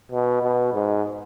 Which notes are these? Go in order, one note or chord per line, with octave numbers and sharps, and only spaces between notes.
B2
B2
G#2